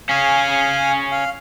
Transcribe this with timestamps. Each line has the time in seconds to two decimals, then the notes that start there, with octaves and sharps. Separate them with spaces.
0.09 C#4 G#4 F5 G#5
1.12 F5